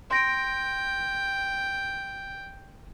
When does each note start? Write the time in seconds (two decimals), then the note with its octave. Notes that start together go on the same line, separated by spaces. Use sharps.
0.11 G5 C6 A#6 D7